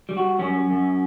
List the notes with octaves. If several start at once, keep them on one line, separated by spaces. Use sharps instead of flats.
G3
F#4
F#2 C#4
F#2